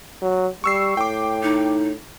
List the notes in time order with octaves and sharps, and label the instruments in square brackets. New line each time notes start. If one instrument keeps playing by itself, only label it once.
[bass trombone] F#3
[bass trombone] G3 [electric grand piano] C#6 E6 C7
[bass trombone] A2 [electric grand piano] G5 D6
[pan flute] D#4